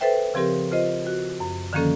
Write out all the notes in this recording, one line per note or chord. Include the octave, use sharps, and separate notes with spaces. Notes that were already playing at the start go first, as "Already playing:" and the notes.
A4 B4 C5 E5 G5
C#3 F3 C4 G4 A#4
F4 C5 D#5
F#4
F#2
D3 D#3 F3 A#3 C#4 A4